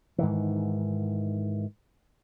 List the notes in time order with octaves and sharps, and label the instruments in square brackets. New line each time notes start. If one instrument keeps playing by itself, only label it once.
[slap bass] G#2 D#3 E3